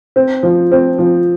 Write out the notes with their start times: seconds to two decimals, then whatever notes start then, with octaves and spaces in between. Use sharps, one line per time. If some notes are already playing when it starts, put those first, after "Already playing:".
0.16 C4
0.43 F3
0.72 C4
0.98 F3